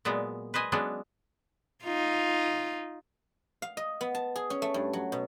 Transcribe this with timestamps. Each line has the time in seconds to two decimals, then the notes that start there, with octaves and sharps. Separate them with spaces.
0.05 A#2 F#3 G#3 B3
0.54 B4 C5 D#5 G#5
0.72 F#3 G#3 B3 C#4 D4
1.84 D#4 F4
3.62 F5
3.77 D#5
4.01 B3
4.15 A5
4.36 G#4
4.50 C#4
4.62 A3
4.74 G2
4.93 F#3
5.12 B2